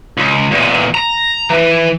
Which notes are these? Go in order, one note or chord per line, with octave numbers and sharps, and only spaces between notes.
C#2
E2 A#2
A#5
E3